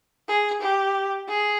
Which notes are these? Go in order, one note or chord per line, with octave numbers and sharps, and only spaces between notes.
G#4
G4
G#4